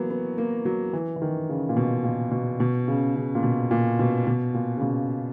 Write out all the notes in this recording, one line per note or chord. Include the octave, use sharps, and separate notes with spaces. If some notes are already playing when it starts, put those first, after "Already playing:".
Already playing: E3 F#3 A#3 B3
B3
A#3
F#3
E3
E3
D#3
C#3
A#2
B2
A#2
B2
B2
C#3
C#3
A#2
B2
A#2
B2
B2
A#2
C#3
B2